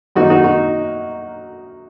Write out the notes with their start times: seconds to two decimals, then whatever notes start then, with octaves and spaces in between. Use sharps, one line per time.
0.16 F#2 D#3 A#3 D#4 F#4
0.30 D#4 F#4
0.44 D#4 F#4